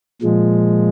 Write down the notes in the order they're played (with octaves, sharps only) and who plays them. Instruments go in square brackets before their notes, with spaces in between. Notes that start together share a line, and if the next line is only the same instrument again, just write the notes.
[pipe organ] A#2 F3 G#3